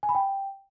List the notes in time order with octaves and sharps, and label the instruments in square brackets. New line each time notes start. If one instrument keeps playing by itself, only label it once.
[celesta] G#5
B5
G5